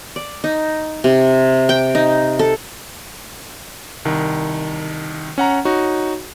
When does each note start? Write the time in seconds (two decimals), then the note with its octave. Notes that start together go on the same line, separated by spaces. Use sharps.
0.16 D5
0.44 D#4
1.04 C3
1.69 G5
1.95 D#4
2.39 A4
4.05 C2 D#3
5.38 C#4 F#5 A#5
5.65 D#4 F#4 C#5